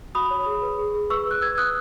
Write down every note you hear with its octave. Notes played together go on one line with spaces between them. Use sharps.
F#4 B5 D#6
C#5
G#4
B4
G#4
G#4
B4 C#6 E6
B4 F#6
B4 E6 G#6
B4 D#6 F#6